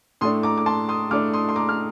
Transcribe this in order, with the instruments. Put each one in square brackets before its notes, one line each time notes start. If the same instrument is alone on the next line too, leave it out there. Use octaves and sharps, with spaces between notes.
[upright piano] A2 A3 D4 C6 D#6
A#5 D6
D6
A5 C6
C6 D#6
A2 A3 D4 D6 F6
C6 D#6
C6
A#5 D6
F6